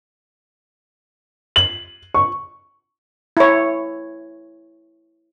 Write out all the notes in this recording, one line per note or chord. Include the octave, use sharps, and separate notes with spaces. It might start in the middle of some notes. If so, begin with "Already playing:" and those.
F#7
C#6
E4 C#5